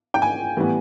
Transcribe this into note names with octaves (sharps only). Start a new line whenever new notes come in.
G5
G#5
A2 E3 G3 B3